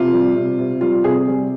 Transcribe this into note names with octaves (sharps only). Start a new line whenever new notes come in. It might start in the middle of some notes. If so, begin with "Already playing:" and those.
Already playing: C3 F4
G3
C3
C3
G3 F4
C3 G#4
G3